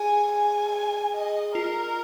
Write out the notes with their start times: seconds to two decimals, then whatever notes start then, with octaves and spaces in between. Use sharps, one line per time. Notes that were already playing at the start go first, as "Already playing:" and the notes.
Already playing: G#4 G#5
0.32 G#5
1.14 D#5
1.55 F4 A#4